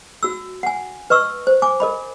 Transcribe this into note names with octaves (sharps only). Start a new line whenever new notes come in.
F#4 E6
F#5 G#5
B4 D#5 C#6 E6
C5
G#5 D6
A#4 D#5 B5